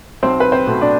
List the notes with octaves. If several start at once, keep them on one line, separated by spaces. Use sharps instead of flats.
B1 C4 C5
B4
C4 C5
B2 A3 C4
D4 D5